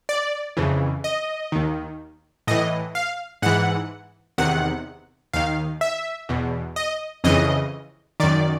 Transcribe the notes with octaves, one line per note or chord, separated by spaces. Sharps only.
D5
F2 C#3 E3
D#5
D#2 D#3
A2 E3 D#5
F5
G#2 E3 F#5
E2 C3 D#3 F#5
D#2 D#3 F5
E5
E2 B2
D#5
F2 C#3 E3 D#5
F#2 D#3 D5